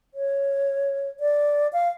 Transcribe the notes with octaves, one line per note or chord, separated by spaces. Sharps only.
C#5
D5
F5